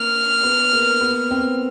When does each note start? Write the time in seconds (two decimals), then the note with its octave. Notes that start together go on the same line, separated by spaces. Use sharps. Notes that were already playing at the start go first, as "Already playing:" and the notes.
Already playing: A#3 F6
0.43 B3
0.73 A#3
1.01 B3
1.31 C4